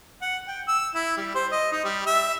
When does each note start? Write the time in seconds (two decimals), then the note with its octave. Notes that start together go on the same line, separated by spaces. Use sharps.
0.22 F#5
0.48 G5
0.68 E6
0.95 E4
1.17 G3
1.35 C5
1.52 D#5
1.72 D#4
1.84 G3
2.07 E5